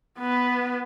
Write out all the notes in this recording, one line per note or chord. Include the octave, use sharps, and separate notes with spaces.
B3 B4